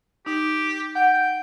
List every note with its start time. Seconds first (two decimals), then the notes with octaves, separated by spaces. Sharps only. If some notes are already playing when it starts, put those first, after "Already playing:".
0.26 D#4 G4
0.95 F#5 G5
1.13 G5